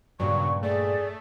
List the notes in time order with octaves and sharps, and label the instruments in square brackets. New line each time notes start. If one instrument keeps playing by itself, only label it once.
[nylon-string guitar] G2 A#2 [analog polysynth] C#3 F#3 [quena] C#6
[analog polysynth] A3 [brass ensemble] G#4 [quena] D5